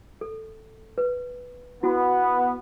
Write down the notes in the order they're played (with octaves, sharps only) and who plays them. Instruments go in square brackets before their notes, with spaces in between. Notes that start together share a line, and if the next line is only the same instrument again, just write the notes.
[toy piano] A4
B4
[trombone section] B3 [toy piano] E4 F#4